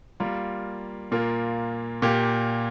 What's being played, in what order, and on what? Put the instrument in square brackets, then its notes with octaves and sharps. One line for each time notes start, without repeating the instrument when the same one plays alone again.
[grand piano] G3 A#3 F4 A#4
A#2 A#3 F4 A#4
A#2 A#3 G4